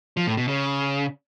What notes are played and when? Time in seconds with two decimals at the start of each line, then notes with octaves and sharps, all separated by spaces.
0.17 F3
0.27 A2
0.37 B2
0.48 C#3